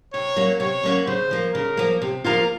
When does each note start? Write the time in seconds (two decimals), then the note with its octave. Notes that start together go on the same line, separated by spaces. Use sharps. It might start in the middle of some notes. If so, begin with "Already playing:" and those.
0.13 C3 C#5
0.36 F#3 A#3 C#4 F#4
0.60 C3 C#5
0.83 F#3 A#3 C#4 F#4
1.07 C#3 C5
1.31 F3 A#3
1.54 C#3 A#4
1.77 F3 A#3
2.02 C3
2.24 F3 A#3 F4 A#4